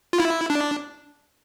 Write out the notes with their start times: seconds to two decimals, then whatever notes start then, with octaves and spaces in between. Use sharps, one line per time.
0.13 F4
0.20 E4
0.50 D4